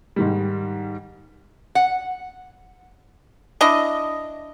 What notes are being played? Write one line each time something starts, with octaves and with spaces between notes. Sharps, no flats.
G#2 D#3 G3
F#5
D4 E4 D#5